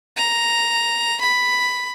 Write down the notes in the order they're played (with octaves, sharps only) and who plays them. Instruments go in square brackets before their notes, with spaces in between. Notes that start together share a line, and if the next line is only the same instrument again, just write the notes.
[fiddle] A#5
B5